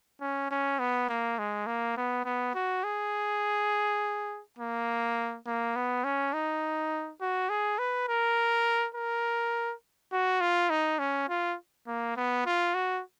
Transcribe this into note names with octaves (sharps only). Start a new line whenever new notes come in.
C#4
C#4
B3
A#3
G#3
A#3
B3
B3
F#4
G#4
A#3
A#3
B3
C#4
D#4
F#4
G#4
B4
A#4
A#4
F#4
F4
D#4
C#4
F4
A#3
B3
F4
F#4